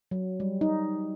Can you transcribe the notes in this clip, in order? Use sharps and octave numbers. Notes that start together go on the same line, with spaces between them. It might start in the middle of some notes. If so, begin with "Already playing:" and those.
F#3
G3
D#4